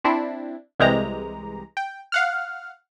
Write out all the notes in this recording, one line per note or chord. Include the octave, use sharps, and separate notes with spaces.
C4 D4 E4
C2 E3 G#3 G4 A#5
G5
F5 F#5 F6